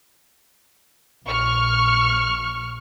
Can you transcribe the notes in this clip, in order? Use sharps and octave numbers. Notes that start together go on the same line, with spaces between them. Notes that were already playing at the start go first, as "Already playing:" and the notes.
A#1 C#6 F6